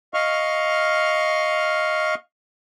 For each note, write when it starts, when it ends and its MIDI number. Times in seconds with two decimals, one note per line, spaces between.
0.14 2.15 75
0.14 2.15 77
0.14 2.15 85
0.14 2.15 89